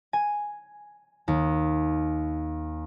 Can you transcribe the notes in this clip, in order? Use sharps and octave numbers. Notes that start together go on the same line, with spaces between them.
G#5
D#2